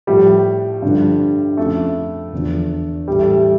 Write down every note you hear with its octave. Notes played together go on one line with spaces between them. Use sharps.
A2 F3 G3
G2 D3 F3
F2 C#3 F3 A3
E2 D3 F3
A2 E3 G3
A3
G3